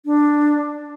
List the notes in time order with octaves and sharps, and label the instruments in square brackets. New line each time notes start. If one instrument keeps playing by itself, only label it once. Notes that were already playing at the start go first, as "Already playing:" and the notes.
[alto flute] D4